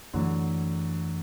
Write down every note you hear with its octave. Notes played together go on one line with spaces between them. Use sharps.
F#2 D3 E3 F#3 A3